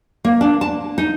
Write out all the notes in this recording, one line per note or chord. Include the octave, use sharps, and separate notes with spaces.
A#3
D4
A5
D#4